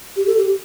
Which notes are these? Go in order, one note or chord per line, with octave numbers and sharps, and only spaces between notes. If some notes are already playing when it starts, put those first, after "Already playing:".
G4
A4
G4